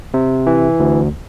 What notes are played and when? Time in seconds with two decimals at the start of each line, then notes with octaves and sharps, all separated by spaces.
0.14 C3
0.47 E3
0.80 D2